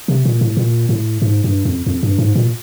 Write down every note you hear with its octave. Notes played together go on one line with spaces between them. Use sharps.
C3
A#2
A2
A#2
A2
G#2
G2
F2
F2
G2
G#2
A#2